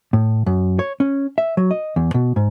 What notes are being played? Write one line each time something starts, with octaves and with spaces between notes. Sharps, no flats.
A2
F#2
C#5
C#4
E5
F#3
D#5
E2
B2
G#2